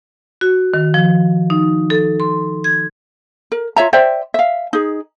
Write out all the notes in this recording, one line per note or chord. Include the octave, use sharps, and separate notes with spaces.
F#4
D#3
F3
D#4
A4
C6
G#6
A#4
F4 C#5 E5 A#5
C5 D5 E5 G5
E5 F5
D#4 G#4